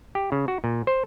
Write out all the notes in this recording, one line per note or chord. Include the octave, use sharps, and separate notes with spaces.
G4
C#3
F#4
A#2
C5